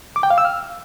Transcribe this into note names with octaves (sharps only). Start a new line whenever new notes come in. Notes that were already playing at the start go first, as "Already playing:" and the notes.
D6
G5
F5
E6
F6